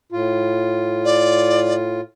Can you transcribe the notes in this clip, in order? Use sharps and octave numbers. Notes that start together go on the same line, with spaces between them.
A2 F4
D5